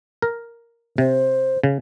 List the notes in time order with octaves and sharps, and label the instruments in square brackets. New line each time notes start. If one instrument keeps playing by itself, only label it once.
[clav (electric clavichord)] A#4
[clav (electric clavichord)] C3 [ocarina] C5
[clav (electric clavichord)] C#3